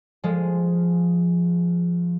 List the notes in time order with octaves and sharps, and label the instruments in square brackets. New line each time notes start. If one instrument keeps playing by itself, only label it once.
[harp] F3 G#3